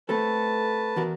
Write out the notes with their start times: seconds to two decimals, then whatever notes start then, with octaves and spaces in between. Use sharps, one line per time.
0.09 A3 C4 A4 B4 A5
0.96 E2 F#4 A#4